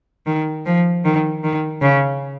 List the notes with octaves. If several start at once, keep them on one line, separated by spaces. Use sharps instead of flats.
D#3
F3
D#3
D#3
C#3